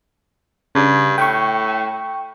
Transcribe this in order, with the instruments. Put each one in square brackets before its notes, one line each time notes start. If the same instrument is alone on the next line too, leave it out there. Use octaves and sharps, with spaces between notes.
[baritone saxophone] G2 [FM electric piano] C#3
[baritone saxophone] A2 [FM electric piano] G5 C#6